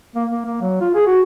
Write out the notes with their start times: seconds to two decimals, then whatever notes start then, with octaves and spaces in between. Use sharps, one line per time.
0.15 A#3
0.31 A#3
0.45 A#3
0.61 F#3
0.81 F4
0.95 G#4
1.07 F#4